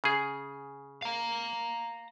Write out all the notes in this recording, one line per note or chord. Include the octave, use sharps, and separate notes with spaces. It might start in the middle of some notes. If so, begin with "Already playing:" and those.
C#3 G#4
F5 A#5